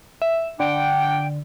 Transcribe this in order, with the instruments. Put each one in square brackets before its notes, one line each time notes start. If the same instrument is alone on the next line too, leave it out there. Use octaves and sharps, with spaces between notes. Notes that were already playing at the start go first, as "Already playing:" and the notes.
[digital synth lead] E5
[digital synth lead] D3 [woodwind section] D4 F#5 G5